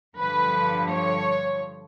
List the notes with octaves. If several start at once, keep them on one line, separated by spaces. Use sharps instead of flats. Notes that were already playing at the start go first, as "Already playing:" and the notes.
G2 D3 F3 B4
C#5